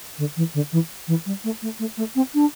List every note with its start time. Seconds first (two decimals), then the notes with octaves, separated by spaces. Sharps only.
0.18 D3
0.36 E3
0.54 D3
0.72 E3
1.08 E3
1.26 G3
1.44 A3
1.62 A3
1.80 A3
1.97 A3
2.15 C4
2.34 D4